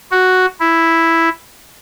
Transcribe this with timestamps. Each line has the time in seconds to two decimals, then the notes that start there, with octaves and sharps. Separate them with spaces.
0.11 F#4
0.60 E4